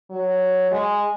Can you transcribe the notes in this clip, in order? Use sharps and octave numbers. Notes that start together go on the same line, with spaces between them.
F#3
G#3